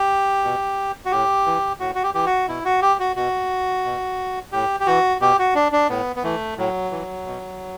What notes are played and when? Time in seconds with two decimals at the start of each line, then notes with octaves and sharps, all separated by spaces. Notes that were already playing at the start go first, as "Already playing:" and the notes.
Already playing: G4
0.44 B2
1.05 F#4
1.11 A2 G4
1.46 E3
1.80 A2 F#4
1.95 F#4
2.03 G4
2.14 E3 G4
2.26 F#4
2.48 B2 E4
2.65 F#4
2.82 G4
3.00 F#4
3.16 B2 F#4
3.85 B2
4.52 A2 G4
4.80 G4
4.87 E3 F#4
5.21 B2 G4
5.39 F#4
5.55 D4
5.72 D4
5.89 A2 B3
6.16 B3
6.23 E3 A3
6.57 A2 F#3
6.91 E3
7.26 B2